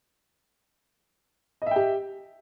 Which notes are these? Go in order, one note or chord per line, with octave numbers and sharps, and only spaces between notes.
G4 D#5 E5 G5